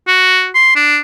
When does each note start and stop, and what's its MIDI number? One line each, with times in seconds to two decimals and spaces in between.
0.08 0.49 66
0.55 0.72 84
0.76 0.99 62